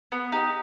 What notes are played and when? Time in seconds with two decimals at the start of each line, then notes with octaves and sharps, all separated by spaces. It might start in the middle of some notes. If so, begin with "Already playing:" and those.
0.12 B3
0.32 D#4 G4